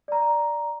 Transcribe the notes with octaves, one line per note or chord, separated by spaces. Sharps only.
D5 A#5